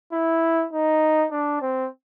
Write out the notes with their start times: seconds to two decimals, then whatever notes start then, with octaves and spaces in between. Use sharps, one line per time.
0.13 E4
0.73 D#4
1.32 D4
1.62 C4